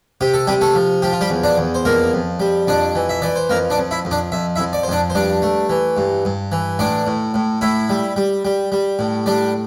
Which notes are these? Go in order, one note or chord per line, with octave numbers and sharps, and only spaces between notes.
C3 G4
A4
C3 G3 G4
A3 A4
F3
F3 G4
F4
G3 G4
E2
D4 D5
E2
C5
F2 A#3 A#4
F2
G3
F2 D4 D5
E3
E5
E3 D5
C5
F2 A#3 A#4
D4 D5
F2
E4 E5
F2
D4 D5
F2 E5
F2 E4 E5
D5
C5
F2 D4 D5
C5
G2 D4 D5
A3
E3
G2
G2
E3
A2 D4 D5
A2
A2
A2 E4 E5
G3
G3
G3
G3
A2
G3 D4 D5